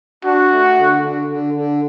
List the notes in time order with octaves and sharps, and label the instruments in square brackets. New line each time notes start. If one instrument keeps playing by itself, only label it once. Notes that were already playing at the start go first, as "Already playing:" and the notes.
[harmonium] D4 [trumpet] F#4
[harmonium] A3
D3
D3
D3
D3